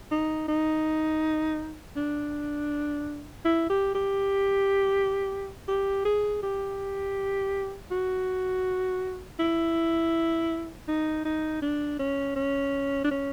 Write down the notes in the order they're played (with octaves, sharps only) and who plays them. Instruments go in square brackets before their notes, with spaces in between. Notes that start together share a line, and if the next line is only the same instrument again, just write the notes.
[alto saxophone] D#4
D#4
D4
E4
G4
G4
G4
G#4
G4
F#4
E4
D#4
D#4
D4
C#4
C#4
D4
C#4